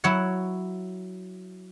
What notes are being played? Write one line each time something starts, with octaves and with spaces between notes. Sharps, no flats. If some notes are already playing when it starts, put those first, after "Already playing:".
F#3 E4 C#5 F#5